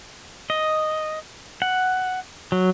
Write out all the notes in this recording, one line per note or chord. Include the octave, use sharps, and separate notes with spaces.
D#5
F#5
F#3